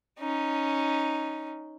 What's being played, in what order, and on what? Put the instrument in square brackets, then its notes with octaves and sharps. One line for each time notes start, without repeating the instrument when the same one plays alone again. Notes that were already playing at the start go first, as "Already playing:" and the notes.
[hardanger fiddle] C#4 D#4